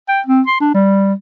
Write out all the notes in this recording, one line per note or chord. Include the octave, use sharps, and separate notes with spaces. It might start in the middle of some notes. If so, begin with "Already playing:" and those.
G5
C4
C6
D4
G3